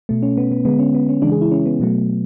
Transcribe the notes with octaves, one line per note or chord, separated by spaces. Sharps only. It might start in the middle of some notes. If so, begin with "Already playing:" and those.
B2 A3
C#4
B3
B3
D3 G#3 B3
C#4
B3
C#4
C#3 E3 G#3 D4
G#4
E4
C#4
B3
B2 F#3 A3